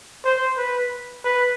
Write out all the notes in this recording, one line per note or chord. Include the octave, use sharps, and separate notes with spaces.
C5
B4
B4